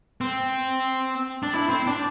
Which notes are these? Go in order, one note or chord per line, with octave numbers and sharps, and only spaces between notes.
C4
D4
E4
C4
D4